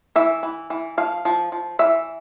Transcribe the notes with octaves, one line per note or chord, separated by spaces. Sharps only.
E3 E5
E3
E3
F3 F5
F3
F3
E3 E5